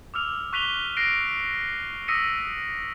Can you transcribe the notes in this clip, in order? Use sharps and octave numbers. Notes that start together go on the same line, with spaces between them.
D6 E6 F6 F7
C#6 F#6 B6 D#7 F7 G7
F#6 A#6 C7 D7
D#6 E6 A#6 B6 C#7 D#7